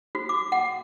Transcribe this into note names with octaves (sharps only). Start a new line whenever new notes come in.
F#4
D6
F#5